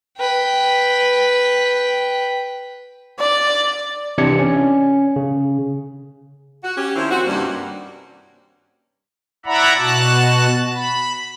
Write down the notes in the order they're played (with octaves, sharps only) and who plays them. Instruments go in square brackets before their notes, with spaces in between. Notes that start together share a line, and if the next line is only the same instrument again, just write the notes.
[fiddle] B4 G5
[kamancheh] D5
[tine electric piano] C3 E3 D4 D5 G#6 C#7
C#4
C#3
[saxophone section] F#4
C#4 G4
D#3 F3 C4 C#4 E4
C4 F#4
G2 C3 D#3 G3 A#3 C#4
[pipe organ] E4 D5 E5 F#5 A#5 B5
B2 F#4 A5 F#6
B5